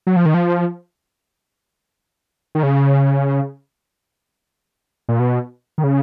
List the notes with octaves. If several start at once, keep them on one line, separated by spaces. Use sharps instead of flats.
F#3
F3
D#3
F3
D#3
C#3
A#2
B2
D#3
C#3